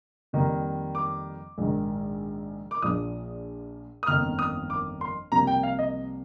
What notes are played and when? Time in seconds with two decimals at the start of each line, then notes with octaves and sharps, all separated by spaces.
0.33 F2 D#3 G3 A#3
0.95 D6
1.58 A#1 G#2 D#3
2.71 D6
2.82 A#1 A#2 F3 D#6
4.03 D#6
4.07 G1 F2 D#3 A#3 F6
4.39 D#6
4.70 D6
5.01 C6
5.32 C2 C3 F3 A#3 A#5
5.47 G5
5.63 F5
5.79 D#5